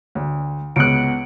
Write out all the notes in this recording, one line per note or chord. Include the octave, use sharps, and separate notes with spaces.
D2
C#2 B3 F#6 C#7 D7